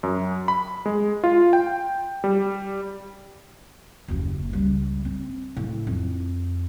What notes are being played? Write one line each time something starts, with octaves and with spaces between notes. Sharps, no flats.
F#2
B5
G#3
F4
G5
G3
F#1 D#2
C#2 G3
C4
A2
F2